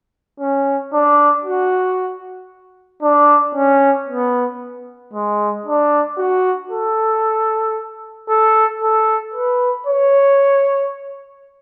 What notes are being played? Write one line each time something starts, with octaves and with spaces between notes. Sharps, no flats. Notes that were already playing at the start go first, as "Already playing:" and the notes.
C#4
D4
F#4
D4
C#4
B3
G#3
D4
F#4
A4
A4
A4
B4
C#5